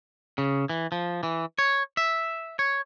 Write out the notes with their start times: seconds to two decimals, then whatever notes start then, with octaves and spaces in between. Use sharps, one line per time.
0.38 C#3
0.69 E3
0.92 F3
1.23 E3
1.59 C#5
1.97 E5
2.59 C#5